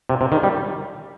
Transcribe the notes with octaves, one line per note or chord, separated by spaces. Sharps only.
C3
C3
D#3
G3